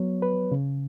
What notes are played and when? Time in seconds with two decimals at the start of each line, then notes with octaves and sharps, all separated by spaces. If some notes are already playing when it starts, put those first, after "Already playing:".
Already playing: F#3 B3 C#5
0.22 B4
0.52 C#3